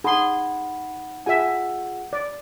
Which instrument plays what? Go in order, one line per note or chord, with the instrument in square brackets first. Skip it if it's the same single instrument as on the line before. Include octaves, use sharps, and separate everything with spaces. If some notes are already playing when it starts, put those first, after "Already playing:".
[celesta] D#4 F#5 B5 [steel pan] G#4 C6
[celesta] F4 G#4 F#5 [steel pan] E5 G#5
[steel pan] D5